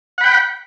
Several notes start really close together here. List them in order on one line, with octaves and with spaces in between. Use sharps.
F#5 B5 G5